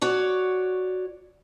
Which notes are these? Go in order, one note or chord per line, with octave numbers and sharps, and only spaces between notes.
F#4 C#5 D5